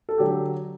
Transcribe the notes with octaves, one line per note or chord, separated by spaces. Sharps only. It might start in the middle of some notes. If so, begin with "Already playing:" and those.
A4
D3 F#3 G4